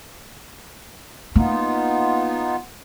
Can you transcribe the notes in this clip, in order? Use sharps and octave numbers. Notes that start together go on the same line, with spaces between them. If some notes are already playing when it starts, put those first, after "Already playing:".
A#3 B3 D#4 F4